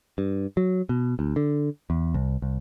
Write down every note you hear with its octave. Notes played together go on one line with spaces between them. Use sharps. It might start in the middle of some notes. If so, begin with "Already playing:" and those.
G2
F#3
B2
D2
D3
E2
C2
C2